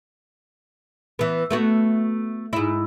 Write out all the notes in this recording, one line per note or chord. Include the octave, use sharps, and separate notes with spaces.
E3 B3
A3 B3 F#4
G#2 E4